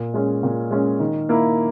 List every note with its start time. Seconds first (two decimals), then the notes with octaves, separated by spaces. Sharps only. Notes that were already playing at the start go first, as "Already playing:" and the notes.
Already playing: A#2
0.14 G#3 C#4
0.43 A#2
0.71 G#3 C#4
0.99 D#3
1.29 A#3 E4